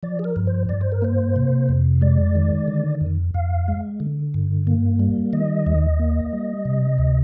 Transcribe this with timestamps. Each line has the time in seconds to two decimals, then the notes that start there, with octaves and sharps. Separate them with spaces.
0.03 F3 D5
0.19 G#4
0.24 A#4
0.36 G2
0.47 C5
0.69 G2 D5
0.81 C5
0.92 A#4
1.02 A#3 C5
1.36 C3
1.69 F2
2.01 G#3 D5
2.35 D#3
2.68 D3
3.01 F2
3.34 F2 F5
3.68 G#3
4.00 D3
4.34 G2
4.67 A#3
4.99 G3
5.33 D#3 D#5
5.66 D#2
6.00 A#3
6.33 G3
6.65 C3
6.98 D2